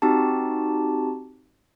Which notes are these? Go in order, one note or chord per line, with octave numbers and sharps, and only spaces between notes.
C4 D#4 F#4 G4 A5